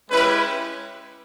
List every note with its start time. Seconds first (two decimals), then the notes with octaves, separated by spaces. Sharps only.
0.10 G#3 C#4 E4 G4 B4